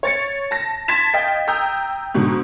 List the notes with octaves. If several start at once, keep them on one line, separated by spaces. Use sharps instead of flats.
C#5 A6 C#7
A5 A#6
A5 C6 G#6 A6 B6 E7
D#5 F5 G5
G5 A#5 D#6 E6 G6
G#2 B2 D3